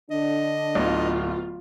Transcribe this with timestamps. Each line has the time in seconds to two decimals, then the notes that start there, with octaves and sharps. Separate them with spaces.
0.11 D3 D4 D#5
0.75 D1 B3 F4